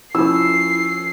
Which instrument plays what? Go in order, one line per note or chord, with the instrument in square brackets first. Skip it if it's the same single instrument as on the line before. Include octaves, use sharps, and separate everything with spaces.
[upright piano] F3 C#4 [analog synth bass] E4 [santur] E6 [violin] C7